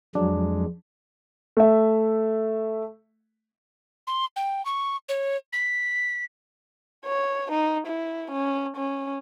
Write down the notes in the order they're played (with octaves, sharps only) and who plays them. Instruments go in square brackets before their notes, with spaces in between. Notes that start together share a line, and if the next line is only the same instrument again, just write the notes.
[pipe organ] F2 G#3 [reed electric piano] F#3 [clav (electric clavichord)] D4
[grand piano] A3 E5
[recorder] C6
G5
C#6
C#5
B6
[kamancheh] C#5
D#4
E4
C#4
C#4